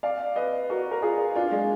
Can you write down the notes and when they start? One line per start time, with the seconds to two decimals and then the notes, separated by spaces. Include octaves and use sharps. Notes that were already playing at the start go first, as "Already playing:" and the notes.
0.03 D5 F5
0.36 B4 D#5
0.70 F#4 A#4
0.91 A#4
1.02 F4 G#4
1.36 D4 F4
1.51 G#3